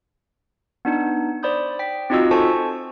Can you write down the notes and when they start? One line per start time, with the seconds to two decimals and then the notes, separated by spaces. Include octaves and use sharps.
0.85 B3 D4 D#4
1.43 C5 D5 B5 D#6 G6
1.79 G5 B6
2.10 C4 D#4 F4 F#4 D#5 E6
2.31 A4 C5 G#5 A5 C#6